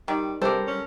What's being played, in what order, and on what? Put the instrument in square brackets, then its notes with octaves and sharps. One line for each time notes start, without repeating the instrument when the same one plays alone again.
[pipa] D#3 [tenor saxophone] G3
[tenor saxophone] C3 [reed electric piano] G3 [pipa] D4 C5 [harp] A4 A#4
[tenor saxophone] C#4